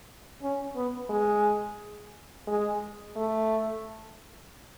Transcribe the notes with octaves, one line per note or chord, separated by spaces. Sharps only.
C#4
B3
G#3
G#3
A3